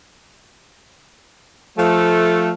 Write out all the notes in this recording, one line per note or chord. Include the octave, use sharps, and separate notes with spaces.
F3 A3